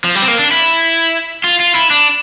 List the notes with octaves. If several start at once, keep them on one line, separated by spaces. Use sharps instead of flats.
F3
G3
C4
A#3
D4
E4
F4
F4
E4
D4